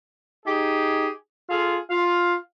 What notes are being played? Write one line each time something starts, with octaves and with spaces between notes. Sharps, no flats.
D#4 G4 G#4
F4 G#4 A4 F5
F4 F5